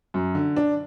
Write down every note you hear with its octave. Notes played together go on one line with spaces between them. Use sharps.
F#2
D3
D4